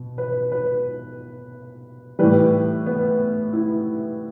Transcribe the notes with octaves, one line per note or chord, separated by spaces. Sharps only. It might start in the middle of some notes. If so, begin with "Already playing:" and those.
Already playing: B2
B4
B4
A2 E3 G3 B4
B3
E4